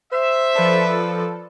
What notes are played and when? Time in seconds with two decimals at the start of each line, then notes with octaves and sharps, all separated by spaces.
0.12 C5 E5
0.55 F3 A4 B4 D5